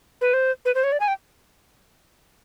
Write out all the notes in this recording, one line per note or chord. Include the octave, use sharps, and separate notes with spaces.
B4
C5
B4
C5
C#5
D5
G#5
G5